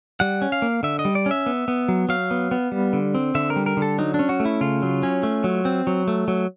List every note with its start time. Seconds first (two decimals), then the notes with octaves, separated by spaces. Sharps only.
0.20 G3 F#5
0.42 C#4
0.52 F5
0.62 A#3
0.83 D3 E5
0.99 D#5
1.05 G3
1.15 D5
1.26 C#4 E5
1.46 B3
1.68 B3
1.88 F#3
2.09 F#3 F5
2.31 B3
2.51 B3
2.72 G3
2.93 D3
3.15 C4
3.35 D3 E5
3.50 A#4
3.56 G3
3.66 A#4
3.77 D3
3.82 A4
3.98 F#3 D#4
4.14 C#4 D4
4.29 F#4
4.40 A3
4.45 E4
4.61 C#3 F4
4.82 F#3
5.03 C#4
5.23 A3
5.44 F#3
5.65 C4
5.87 F#3
6.08 A3
6.28 F#3